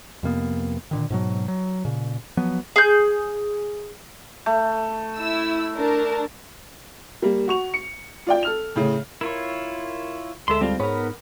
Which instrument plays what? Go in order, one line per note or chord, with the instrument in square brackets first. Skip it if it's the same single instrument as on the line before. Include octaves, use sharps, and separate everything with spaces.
[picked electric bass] F2 C3 A#3 B3
A#2 D3 D#3
G#2 B2 F#3
F#3
A#2 C#3
F3 F#3 B3
[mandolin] G#4 G6
[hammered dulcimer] A3
[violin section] E4 E6
D4 A#4 A5
[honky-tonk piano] G3 A#3
F#4 C#6 F7
C#7
F4 D5 G5
A4 F6 F7
A2 C#3
[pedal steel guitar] E4 F4 C#5 [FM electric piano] A#4
[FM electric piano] D2 G#3 A4 [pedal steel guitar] E5 C6
[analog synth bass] G3 [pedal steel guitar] C4 F4
[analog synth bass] G#2 [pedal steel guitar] B3 A#4 [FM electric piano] C#5 B5